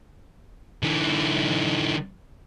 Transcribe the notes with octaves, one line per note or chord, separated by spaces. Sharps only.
D3 E3